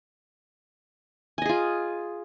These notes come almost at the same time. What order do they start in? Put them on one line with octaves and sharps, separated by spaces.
G#5 D#5 G#4 F4